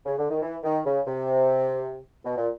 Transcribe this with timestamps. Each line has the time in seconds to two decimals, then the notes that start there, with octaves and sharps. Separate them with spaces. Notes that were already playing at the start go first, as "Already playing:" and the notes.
0.05 C#3
0.17 D3
0.30 D#3
0.41 E3
0.64 D#3
0.85 C#3
1.06 C3
2.24 B2
2.36 A#2